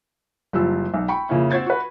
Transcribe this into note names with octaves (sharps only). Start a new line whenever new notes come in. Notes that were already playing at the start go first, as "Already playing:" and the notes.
F#1 F3 G3 E6
B1
G5 B5 C#6
F2 C#3 A#3 C#4 E4
C4 F#4 C5 G#6 A6
F#4 B4